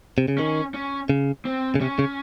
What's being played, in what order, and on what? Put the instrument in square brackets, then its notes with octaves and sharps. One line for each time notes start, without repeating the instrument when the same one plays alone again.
[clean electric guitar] C3
C#3
[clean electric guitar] D#3 [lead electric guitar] C#4
[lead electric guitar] C#4
[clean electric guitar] C#3
[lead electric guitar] C4
[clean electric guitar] C#3
[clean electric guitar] C3 [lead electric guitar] C#4
[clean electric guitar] C#3